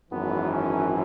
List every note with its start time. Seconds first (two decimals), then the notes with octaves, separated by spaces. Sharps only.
0.10 G#1 F#2 E3 B3
0.51 C#4